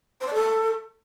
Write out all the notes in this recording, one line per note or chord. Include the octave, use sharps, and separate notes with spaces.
C5
D5
A4